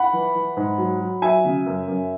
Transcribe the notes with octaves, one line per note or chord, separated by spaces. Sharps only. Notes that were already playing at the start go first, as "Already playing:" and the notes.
Already playing: F#5 B5
E3
E3
G#2
F#3
F#3
F#3 E5 G#5
C#3
F#2
F#2